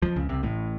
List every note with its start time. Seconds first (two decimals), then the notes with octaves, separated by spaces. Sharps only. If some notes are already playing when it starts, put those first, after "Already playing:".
0.02 F2 F3
0.16 C#2 C#3
0.29 C2 C3
0.43 A1 A2